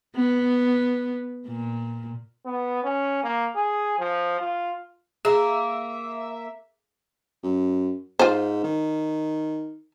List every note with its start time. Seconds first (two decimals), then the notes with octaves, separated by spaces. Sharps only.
0.15 B3
1.47 A#2
2.46 B3
2.84 C#4
3.23 A#3
3.56 G#4
3.99 F3
4.40 F4
5.25 A#3 G#4 E5
7.43 F#2
8.19 G#2 F4 C5
8.63 D#3